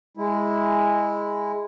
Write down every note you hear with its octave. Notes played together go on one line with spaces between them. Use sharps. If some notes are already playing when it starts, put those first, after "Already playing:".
G#3 E4